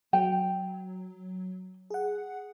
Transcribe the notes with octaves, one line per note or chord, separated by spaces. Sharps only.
F#3 G5
G#4 F#5